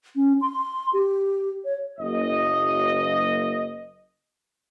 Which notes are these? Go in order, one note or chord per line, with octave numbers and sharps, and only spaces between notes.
C#4
C6
G4
C#5
F#1 D#5